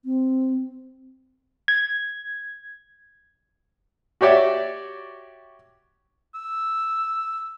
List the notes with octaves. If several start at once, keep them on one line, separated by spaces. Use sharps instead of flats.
C4
G#6
F#4 G4 C#5 D5 E5
E6